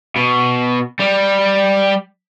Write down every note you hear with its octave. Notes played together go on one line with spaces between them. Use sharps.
B2
G3